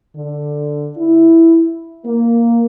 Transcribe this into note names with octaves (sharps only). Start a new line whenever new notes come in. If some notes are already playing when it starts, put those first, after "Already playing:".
D3
E4
A#3